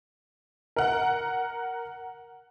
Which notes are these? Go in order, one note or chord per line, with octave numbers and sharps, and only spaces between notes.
A#4 F#5